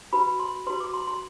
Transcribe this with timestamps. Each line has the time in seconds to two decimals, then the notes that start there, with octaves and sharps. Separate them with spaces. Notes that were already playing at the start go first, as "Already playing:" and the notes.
0.13 F#4 B4 B5
0.40 C6
0.67 F#4 B4 C6
0.80 D6
0.94 C6
1.07 C6